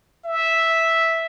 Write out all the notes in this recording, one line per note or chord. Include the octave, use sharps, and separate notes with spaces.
E5